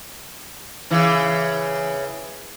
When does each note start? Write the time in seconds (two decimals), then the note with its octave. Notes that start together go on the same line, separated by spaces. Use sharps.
0.90 C#3 E3